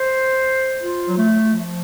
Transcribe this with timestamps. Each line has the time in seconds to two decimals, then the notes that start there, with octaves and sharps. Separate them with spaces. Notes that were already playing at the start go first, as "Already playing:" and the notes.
Already playing: C5
0.82 F4
1.07 F#3
1.17 A3
1.53 F3